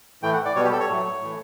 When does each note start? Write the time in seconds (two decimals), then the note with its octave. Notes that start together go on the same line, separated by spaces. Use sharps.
0.22 A2 E3 A3 G5
0.33 F#5
0.45 D5
0.55 B2 G3 B3 C#5
0.64 G4
0.72 A4
0.80 C#5
0.89 A2 F#3 A3
1.21 A2 E3 A3